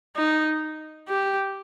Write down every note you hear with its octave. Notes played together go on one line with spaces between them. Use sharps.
D#4
G4